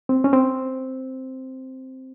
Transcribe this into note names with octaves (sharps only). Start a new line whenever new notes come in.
C4
C#4
C4